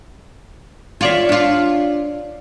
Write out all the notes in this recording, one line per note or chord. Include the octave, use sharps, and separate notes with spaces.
F4 C#5 D5 E5
D4 F4